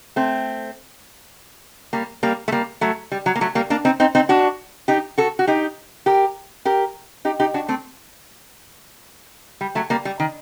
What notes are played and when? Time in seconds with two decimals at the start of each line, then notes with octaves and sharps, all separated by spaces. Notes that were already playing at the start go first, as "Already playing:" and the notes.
0.16 A3 C4
1.93 G3 A#3
2.23 G3 A#3
2.48 A3
2.52 G3 A#3
2.81 F#3 A3
3.12 G3
3.26 F#3
3.36 A#3
3.41 F#3 A3
3.55 G3 A#3
3.70 A#3 D4
3.85 C4 D#4
4.00 C4 D#4
4.15 C4 D#4
4.29 D4 F#4
4.88 D#4 G4
5.18 F#4 A4
5.39 F#4
5.47 D#4 G4
6.06 G4 A#4
6.65 G4 A#4
7.25 D#4 G4
7.40 D#4 G4
7.54 D4 F#4
7.68 A3 C4
9.61 G3
9.75 F#3 A3
9.90 G3 A#3
10.05 G3
10.20 D#3